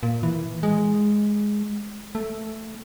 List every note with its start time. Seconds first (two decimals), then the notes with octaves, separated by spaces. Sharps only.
0.03 A#2
0.23 E3
0.63 G#3
2.15 A3